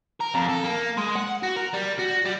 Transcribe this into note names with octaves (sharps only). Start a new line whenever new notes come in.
A#4
F2
A4
A#3
G#3
F#5
F#4
A#4
G3
F#4
G3